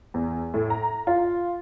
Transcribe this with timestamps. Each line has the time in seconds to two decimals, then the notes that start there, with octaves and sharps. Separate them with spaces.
0.14 E2
0.54 A2
0.70 A#5
1.07 F4